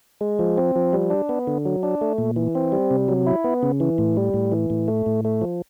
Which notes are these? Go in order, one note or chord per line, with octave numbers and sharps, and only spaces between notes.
G#3
F3
C4
F3
G3
D4
B3
D3
F#3
D4
A3
A#2
E3
C4
G3
C3
F#3
E4
B3
C#3
E3
A2
G3
A2
E3
A2
A3
A2
A3
F3